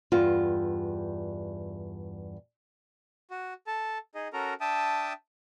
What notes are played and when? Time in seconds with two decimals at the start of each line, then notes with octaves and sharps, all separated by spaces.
0.12 E2 G2 F4
3.31 F#4
3.67 A4 A5
4.15 D#4 G#4 D#5
4.33 C#4 F#4 A4 A#4 A#5
4.61 D4 E5 G5 A5 D#6